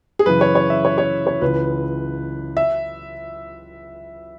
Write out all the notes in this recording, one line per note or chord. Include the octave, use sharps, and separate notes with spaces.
G#4
F#2 C#3 E3 B4
C#5
C#5
E5
C#5
C#5
C#5
C#2 C#3 E3 B4
E5